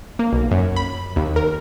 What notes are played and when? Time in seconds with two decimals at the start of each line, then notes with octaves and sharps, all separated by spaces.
0.19 A#3
0.33 B1
0.51 F#2
0.76 B5
1.16 D#2
1.36 A#4